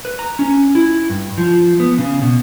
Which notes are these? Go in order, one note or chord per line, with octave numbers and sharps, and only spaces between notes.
B4
A#5
C#4
E4
G2
F3
B3
C#3
B2